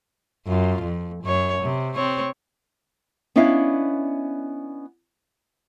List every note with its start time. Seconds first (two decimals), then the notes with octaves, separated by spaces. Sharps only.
0.47 F#2 F4
0.82 F2
1.24 F#2 C#5
1.63 C3
1.95 C4 C#5
3.36 B3 C#4 D4 E4 D#5 F5